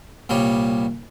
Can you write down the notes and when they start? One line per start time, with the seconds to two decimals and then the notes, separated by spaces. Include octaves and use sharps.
0.29 C2 A#2 G3 C#5